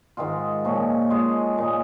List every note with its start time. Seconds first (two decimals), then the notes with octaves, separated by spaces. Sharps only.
0.17 G#2 D#3 G#3 F4
0.65 A#2 F3 C#4
1.10 G#3 F4 G#4
1.58 A#2 G#3 D#4